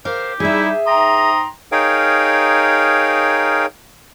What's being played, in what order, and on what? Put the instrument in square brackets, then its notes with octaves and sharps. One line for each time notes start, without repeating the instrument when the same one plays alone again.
[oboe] G4 [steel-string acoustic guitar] A#4 C5 F5
[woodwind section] G3 D#4 [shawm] E4 [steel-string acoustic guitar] G#4 E5
[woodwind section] G#2 G5 A#5 [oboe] C6 [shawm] D#6
[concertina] D#4 G#4 A#4 C#5 F5 G5